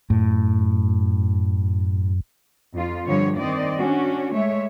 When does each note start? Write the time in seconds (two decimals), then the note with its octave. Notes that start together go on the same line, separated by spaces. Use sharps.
0.10 F#2 A2
2.74 F2 F4
3.07 G2 D3 F3 G3 C#5
3.38 D#3 C4 D5 D#5
3.79 C#4 D4 F#4
4.33 G#3 A3 C#5 E5